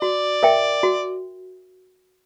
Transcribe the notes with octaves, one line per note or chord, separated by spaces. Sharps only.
F#4 D5
A#4 E5 G5
F#4